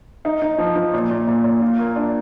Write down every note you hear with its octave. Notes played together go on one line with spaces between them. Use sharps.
D#4
D#4
F3
F3
A#2
A#2
A#2
A#2
F4
A#3
D4